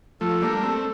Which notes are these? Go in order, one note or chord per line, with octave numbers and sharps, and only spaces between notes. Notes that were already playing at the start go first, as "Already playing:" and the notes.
F3 A3 A4
G3 A#3 D4
A3 C4 A4